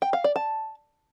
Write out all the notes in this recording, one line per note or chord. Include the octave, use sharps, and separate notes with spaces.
G5
F5
D5
A5